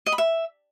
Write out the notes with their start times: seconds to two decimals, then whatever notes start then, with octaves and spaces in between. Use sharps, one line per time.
0.06 D#5
0.12 B5
0.18 E5